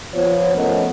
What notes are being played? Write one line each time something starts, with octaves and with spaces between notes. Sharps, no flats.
F3 B3 F4 C5 C#5
F3 A3 B3 C#4 A#4 D#5